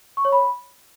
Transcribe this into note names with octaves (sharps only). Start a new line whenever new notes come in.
C#6
C#5
B5